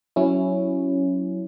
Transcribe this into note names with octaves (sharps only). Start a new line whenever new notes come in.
F#3 C#4 E4